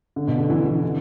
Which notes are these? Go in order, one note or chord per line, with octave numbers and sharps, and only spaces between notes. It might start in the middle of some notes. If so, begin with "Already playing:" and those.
D3
B2
D3
E3
E3
D3